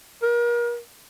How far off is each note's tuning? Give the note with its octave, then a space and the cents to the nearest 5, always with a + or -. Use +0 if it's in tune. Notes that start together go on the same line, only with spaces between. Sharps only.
A#4 +35